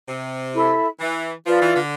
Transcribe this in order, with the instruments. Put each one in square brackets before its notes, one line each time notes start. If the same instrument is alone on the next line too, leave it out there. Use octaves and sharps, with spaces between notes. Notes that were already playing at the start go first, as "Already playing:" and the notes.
[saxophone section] C3
[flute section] E4 A4 E5 B5
[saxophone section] E3
[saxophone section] F3 [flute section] F4 B4 D5
[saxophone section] E3
D3